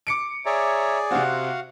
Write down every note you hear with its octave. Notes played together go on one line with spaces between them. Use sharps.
D6 C#7 D7
G#4 C#5 D5 E5 A#5
C3 C4 F#4 F5 F#5